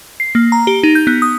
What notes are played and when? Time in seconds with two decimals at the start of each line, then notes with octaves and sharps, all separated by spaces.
0.20 C7
0.35 A#3
0.52 A#5
0.67 G4
0.83 D#4
0.95 G6
1.07 B3
1.22 D#6